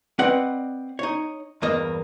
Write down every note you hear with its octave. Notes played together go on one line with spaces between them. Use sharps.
C4 B4 D5 D#5 F#5
D#4 C#5
E2 G2 A#3 D#5